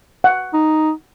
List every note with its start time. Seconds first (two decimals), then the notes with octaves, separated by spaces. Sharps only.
0.24 F#5
0.53 D#4